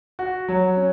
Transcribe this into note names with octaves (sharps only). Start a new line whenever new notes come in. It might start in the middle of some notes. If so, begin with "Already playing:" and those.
F#4
F#3
C#4